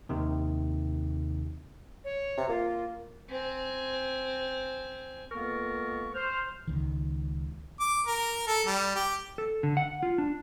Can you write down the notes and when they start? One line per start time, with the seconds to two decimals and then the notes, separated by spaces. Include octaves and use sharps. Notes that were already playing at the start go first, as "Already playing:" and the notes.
0.09 D#2 C3 D#3
2.04 C#5
2.37 C3
2.49 A#3 F4
3.29 C4 G#5
5.31 C#2 A#3 B3 A4 A#4 C#6
6.14 C5 F6
6.67 C#2 D#3
7.80 D6
8.06 A#4
8.47 A4
8.67 G3
8.95 G4
9.38 A4
9.63 D3
9.77 F#5
10.03 F4
10.18 D4